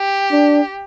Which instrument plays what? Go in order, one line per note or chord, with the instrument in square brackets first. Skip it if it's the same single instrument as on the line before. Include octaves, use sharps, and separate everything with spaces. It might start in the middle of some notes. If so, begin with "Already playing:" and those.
Already playing: [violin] G4
[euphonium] D4